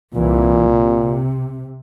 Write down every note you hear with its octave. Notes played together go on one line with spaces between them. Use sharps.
C2 A#2 E3
C3